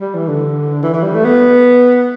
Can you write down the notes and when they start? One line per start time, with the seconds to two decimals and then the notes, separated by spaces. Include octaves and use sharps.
0.01 G3
0.15 E3
0.28 D3
0.83 E3
0.94 E3
1.03 G3
1.14 A3
1.24 B3